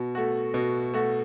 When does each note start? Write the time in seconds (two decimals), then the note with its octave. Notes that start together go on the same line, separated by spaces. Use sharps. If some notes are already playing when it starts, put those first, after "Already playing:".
Already playing: B2
0.15 A3 F#4
0.54 B2
0.94 A3 F#4